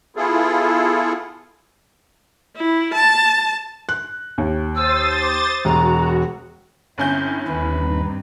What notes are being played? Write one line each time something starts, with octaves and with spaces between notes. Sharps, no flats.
B3 E4 F4 G#4 A4
E4
A5
F#6
D#2
C5 D#6 E6 A6
D6
E1 F#4 A#5
G1 C4 C#4 E4 G6
D#2 B4
G2 C4 D#4